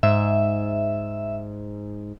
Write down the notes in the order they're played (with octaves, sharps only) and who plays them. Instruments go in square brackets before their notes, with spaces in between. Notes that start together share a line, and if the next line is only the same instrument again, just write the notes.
[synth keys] G#2 [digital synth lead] E5